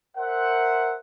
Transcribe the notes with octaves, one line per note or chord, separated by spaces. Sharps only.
A#4 C5 E5 F#5